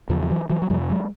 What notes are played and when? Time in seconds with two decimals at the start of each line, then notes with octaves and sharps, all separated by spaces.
0.09 E2 D#3 F3
0.13 C#3
0.22 F3
0.30 E3 F#3
0.50 E3 F#3
0.62 F#3
0.70 F2 C3 F3 G3
0.90 F#3 G#3